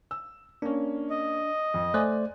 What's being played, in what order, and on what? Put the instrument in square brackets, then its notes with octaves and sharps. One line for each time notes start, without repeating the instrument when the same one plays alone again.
[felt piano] E6
[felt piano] A#3 C#4 [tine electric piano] D4
[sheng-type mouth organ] D#5
[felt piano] F2
[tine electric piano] A3 C5 D5 [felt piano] G#5 F#6